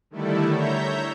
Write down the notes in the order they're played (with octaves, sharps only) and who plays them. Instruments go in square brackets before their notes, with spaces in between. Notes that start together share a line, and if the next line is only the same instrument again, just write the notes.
[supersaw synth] D3 D#3 G3 A3 E4 A4
C#5 E5 A#5 G6